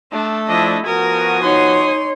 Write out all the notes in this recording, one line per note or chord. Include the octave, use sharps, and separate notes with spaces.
A3 D4
F3 D4 E4 D#5
F3 B3 F#4 A#4 G#5 D#6
D#4 C#5 C6